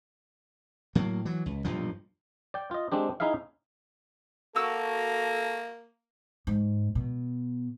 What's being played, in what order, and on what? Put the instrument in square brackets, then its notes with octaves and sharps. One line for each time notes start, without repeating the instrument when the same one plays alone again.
[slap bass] A2 F#3 A#3
E3 F#3
C#2
B1 G2 A#2 F3
[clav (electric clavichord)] D5 G5
F4 D#5
G#3 C4 D4 G4
D#4 E4 G#4 E5 F5
[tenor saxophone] A#3 [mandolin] F#4 D6 E6 [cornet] A4
[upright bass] G#2
B2